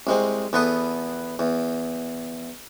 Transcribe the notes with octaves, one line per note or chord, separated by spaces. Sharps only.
C2 G#3 C4
E2 B3 A4 B4 D#6
E2